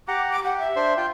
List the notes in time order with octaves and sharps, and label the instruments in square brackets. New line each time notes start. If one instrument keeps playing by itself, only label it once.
[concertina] G4 F#5 A#5 [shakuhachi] D6
[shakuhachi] D6
[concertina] G4 [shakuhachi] F#5
[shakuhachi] E5
[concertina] D4 C5
F4 G5